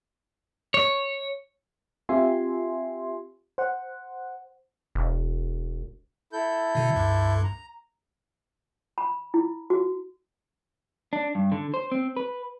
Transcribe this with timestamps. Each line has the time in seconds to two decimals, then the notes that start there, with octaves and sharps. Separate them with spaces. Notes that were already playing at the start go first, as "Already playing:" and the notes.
0.74 C#5
2.09 C4 F4 G4 E5 G#5 C6
3.58 C5 F#5
4.95 E1
6.33 E4 A4 G6
6.75 B2 D3
6.96 C#2 G2
7.44 A#5
8.98 B5
9.34 E4
9.70 F#4
11.13 D4
11.35 G2
11.52 D3
11.74 C5
11.92 C4
12.17 B4